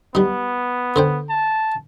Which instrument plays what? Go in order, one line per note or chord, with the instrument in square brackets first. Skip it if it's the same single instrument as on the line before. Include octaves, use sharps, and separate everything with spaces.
[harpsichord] G3 D#4 [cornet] B3
[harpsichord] D3 C5 G5
[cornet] A5